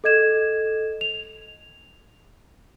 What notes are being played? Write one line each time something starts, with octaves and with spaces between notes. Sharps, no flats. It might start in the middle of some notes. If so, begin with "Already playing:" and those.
A4 D#5 G#6 E7
F7